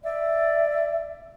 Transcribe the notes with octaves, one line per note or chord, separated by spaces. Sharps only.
D5 E5